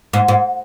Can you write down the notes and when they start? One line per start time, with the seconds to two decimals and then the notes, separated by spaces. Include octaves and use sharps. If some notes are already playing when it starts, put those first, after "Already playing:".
0.13 G#2
0.28 G#2